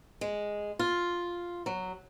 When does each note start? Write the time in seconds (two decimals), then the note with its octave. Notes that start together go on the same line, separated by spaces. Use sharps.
0.21 G#3
0.79 F4
1.66 F#3